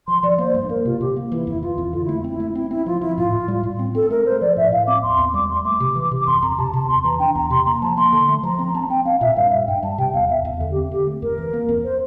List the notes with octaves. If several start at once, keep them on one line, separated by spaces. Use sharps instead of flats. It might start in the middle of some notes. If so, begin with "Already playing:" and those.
F3 C6
F3 D5
A#3 C5
G2
A#3 A#4
C3 F4
C3 G4
A#3
E3 E4
F2 E4
E3 F4
F2
D3 F4
A3 E4
C4 E4
A3
C4 E4
C4 E4
F3 F4
F3 E4
A2 F4
A2
G3
A2
C4
C4 A4
A3 A#4
A3 C5
F3 D5
A2 E5
A2 F5
C4 D6
E2 C6
E2
G3 D6
G3 C6
A3 D6
C3
E3
C3
D6
F2 C6
F2 A#5
C3 A5
C3 A5
E2 C6
E3 A#5
D4 G5
E2 A#5
C3 C6
A#3 A#5
F3 A5
A#3 C6
D3
A3
F3 A#5
C4 A#5
C4 A5
C4 G5
C4 F5
A#2 E5
G2 F5
G2 E5
G2 G5
G3 A5
C3 G5
E2 F5
E2 E5
E2
D3
G4
C4
D3 G4
A3
F2 A#4
E3
A#3
F2
C5